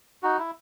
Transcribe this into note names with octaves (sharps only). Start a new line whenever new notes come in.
D#4 F#4
E4